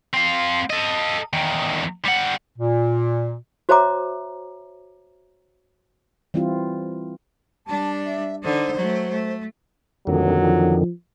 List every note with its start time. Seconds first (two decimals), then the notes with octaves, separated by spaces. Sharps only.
0.14 C4 F5
0.70 A4 D#5
1.33 E2 D#3
2.05 G3 F#5
2.58 A#2
3.69 F#4 C5 C#5 E5 A#5 D6
6.34 E3 G3 C4 E4 F4
7.67 G3 D4 A5
8.05 E5
8.43 D3 D#4 C5
8.76 F#3 A3
9.11 A3
10.07 D#1 F2 D3 D#3 F#3
10.42 F3